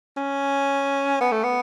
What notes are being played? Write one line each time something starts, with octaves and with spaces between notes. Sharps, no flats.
C#4
B3
A3
B3